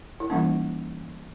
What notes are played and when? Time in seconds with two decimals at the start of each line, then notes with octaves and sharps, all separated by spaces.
0.20 E4
0.30 E3 G3 A#3 C#4 D#4